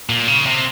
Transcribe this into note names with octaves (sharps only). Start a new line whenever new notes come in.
A#2
C#3
C3